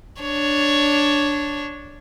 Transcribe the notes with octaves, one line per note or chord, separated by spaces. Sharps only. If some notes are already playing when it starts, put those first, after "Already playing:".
D4 C#5